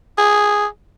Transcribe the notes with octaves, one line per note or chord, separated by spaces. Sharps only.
G#4